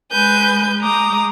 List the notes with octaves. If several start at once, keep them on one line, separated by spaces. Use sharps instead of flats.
G#3 B4 G#5 G6
G#3 A#5 D6 D#6